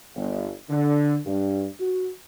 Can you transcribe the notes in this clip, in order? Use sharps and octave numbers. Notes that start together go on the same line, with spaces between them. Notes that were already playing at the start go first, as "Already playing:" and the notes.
G1
D3
G2
F#4